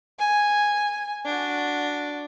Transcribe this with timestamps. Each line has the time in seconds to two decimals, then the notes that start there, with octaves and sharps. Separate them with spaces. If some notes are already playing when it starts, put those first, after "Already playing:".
0.19 G#5
1.26 D4 F#4